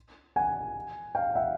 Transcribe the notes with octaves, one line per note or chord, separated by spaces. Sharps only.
F#5 G#5
F5 G5
E5 F#5